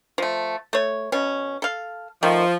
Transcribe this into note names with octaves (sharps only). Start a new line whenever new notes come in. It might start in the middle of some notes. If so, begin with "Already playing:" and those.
F3 A3
A3 C#5
B2 C#4
A4 F5
D#3 F3 A3